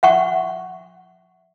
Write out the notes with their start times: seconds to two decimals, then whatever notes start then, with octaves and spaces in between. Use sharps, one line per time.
0.03 E5 F#5 C#6